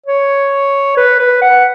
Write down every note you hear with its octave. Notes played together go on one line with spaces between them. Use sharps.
C#5
B4
B4
F#5